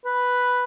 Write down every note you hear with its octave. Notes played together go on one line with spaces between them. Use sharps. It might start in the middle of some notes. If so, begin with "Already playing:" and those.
B4